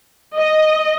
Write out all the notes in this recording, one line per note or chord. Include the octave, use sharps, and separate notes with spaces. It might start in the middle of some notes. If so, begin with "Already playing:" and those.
D#5